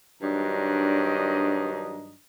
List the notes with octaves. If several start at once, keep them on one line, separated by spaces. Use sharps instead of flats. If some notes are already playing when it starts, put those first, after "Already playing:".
G2 D#3 F#3 D4 D#5 A#5